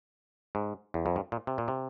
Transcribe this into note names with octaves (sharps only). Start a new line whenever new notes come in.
G#2
E2
F2
G2
A#2
C3
A#2
C3